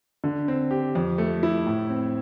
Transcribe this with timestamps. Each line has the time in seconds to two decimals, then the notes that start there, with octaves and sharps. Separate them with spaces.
0.24 D3
0.48 C4
0.71 G4
0.95 F2
1.18 A3
1.43 E4
1.66 A2
1.90 C4